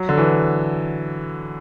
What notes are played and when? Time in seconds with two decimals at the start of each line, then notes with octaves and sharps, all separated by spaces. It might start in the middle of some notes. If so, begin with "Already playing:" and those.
Already playing: F#3
0.09 D3
0.18 E3